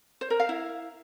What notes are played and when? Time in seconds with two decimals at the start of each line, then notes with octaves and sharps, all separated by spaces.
0.21 C5
0.30 A#4
0.40 F5
0.49 E4